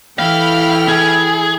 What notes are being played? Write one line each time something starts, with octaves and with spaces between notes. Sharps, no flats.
E3 E4 A4 F5 G5 B5 F6
G#4